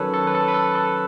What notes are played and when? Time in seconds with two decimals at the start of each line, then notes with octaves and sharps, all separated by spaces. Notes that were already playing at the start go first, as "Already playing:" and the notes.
Already playing: D#3 F#3 C#4 A4 B4 C#5
0.14 A4
0.27 B4
0.35 A4
0.48 B4
0.54 A4
0.75 A4